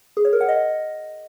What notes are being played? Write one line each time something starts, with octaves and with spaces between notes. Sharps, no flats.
G#4
C#5
A#4
F#5
D#5